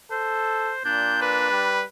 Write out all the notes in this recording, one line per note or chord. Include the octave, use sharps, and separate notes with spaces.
A4 C5
A#2 D4 G6
B4
G3